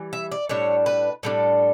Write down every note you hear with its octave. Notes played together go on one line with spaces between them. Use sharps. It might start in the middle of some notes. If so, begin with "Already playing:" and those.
Already playing: E3 G3
E5
D5
A2 G3 D4 C#5
B4
A2 G3 D4 A4